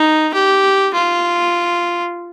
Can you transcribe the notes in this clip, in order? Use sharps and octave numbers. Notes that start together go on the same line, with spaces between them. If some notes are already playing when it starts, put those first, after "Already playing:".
Already playing: D#4
G4
F4